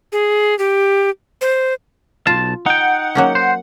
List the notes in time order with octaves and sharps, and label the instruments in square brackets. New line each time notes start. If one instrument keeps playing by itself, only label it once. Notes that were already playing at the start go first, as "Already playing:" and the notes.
[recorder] G#4
G4
C5
[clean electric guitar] B1 A5 [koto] F4
[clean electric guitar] D#4 G5 [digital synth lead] F#5
[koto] F#3 A#3 C#4
[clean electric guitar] C5